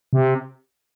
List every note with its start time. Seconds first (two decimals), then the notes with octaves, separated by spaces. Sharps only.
0.13 C3